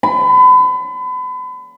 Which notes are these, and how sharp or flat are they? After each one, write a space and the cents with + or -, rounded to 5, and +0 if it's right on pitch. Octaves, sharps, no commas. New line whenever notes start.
B5 +35